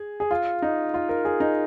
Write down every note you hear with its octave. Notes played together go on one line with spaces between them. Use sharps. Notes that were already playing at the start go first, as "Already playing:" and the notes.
Already playing: G#4
G#4
F4
D#4
F4
A#4
G#4
D#4